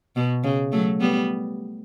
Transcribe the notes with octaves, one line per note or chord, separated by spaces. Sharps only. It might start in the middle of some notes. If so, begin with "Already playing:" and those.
B2
C#3
F#3 A3
G3 B3